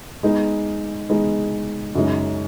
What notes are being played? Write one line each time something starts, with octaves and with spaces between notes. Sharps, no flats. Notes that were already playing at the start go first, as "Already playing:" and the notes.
G#3 B3 D#4
G#3 B3 D#4
F#2 C#3 G#3 D#4